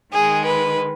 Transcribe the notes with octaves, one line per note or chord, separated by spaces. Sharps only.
D#3 G#3 G#4
B4